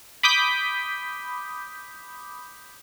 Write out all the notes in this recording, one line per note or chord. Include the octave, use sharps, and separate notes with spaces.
B5 D6 D#6 G6 B6